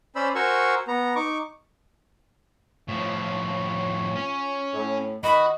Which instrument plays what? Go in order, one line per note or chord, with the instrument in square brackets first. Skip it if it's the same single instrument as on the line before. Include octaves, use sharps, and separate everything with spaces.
[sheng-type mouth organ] C#4 C5 D5 B5 E6
F#4 A#4 C5 G#5 C#6 E6
B3 A#5
D#4 C#6 D6
[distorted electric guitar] A2 F3 [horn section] F4 C#5
[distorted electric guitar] C#4
[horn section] A2
[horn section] D#3 [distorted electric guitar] F#4 [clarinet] D#5 [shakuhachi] B5